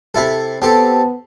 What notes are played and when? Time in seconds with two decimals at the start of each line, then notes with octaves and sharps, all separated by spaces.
0.15 C3 E4 A4
0.62 B3 C4 G4 A4 A5